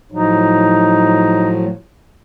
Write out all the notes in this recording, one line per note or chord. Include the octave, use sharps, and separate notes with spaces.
A2 F3 F#3 D#4